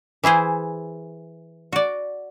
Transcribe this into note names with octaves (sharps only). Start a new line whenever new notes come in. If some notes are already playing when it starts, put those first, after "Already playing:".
E3 E4 G#4 C5
F#4 D5